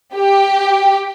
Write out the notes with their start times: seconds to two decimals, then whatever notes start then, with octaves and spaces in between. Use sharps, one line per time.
0.15 G4